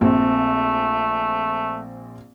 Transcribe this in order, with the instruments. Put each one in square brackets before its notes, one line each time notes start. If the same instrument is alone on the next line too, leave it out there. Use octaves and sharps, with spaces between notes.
[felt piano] A#1 C4 [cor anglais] A3